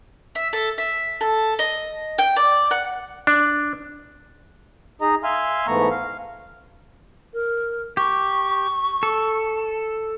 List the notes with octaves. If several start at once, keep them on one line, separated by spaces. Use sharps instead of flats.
E5
A4
E5
A4
D#5
G5
D5
F#5
D4
D#4 G#4 D#5 A#5
E5 F5 G#5 C6 F6
G#2 E3 A3 B3 A#5 C#6
F5
A#4
G4 C#6
A4